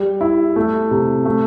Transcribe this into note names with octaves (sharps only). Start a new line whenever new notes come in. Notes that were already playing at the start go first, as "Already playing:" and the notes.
Already playing: G3
E4
A3
C3
A3